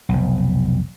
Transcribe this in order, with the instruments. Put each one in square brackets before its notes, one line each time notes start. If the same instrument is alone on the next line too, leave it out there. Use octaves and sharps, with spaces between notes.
[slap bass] F1 B1